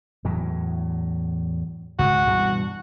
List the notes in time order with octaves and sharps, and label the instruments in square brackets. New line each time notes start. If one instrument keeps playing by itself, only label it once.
[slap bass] E2 A2 F#3
[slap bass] C#2 G#2 C#3 [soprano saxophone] F#4
[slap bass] G2 B2 E3